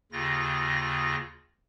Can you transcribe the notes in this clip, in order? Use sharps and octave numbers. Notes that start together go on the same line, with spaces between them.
D#2 C#3 F4 A#6